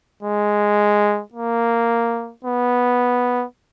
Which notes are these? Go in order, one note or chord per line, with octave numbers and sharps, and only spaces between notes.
G#3
A#3
B3